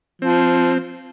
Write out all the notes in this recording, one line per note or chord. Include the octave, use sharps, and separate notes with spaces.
F3 C4